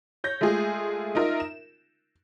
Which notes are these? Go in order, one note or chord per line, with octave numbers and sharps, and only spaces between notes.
C#5 G6 A#6
G#3 A3 F4 G#4
D#4 F4 A#4 E5
E7